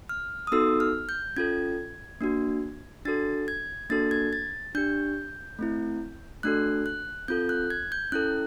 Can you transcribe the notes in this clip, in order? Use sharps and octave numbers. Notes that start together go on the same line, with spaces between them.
F6
D#6
B3 D#4 F#4 A4 E6
F6
G6
C#4 F4 A4 G#6
A#3 D4 F#4
D4 F#4 A4 A6
G#6
A#3 D4 F#4 A4 A6
G#6
A6
D4 G4 G6
A3 C4 E4
A3 D4 F#4 A4 F#6
F#6
C4 F4 A4 G6
F#6
G#6
G6
C#4 E4 A4 F#6